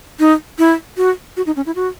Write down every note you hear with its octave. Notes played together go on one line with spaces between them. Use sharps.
D#4
E4
F#4
F#4
D#4
C#4
E4
F#4